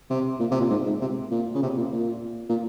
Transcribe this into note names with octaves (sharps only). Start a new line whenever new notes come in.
C3
A#2
C3
A#2
G#2
G#2
C3
A#2
C#3
C3
A#2
A#2
A#2